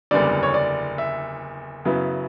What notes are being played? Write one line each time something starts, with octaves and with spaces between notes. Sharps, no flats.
F#1 E2 D3 G3 D5
C#5
D5
E5
F#2 C#3 F#3 B3 E4